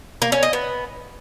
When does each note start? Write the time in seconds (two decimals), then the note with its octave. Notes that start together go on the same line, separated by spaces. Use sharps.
0.22 A#3
0.32 C#4
0.43 D#5
0.53 B3